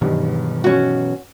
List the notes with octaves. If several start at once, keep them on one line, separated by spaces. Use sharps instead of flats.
G2 B2 D#3 E3 F#3
C#4 F#4